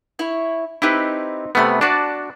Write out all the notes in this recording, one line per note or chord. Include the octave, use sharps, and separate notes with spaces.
E4 C#5
C4 D#4 E4 G4 B4
C3 A3 B3 B5 F6
D4 F#4 D5 A5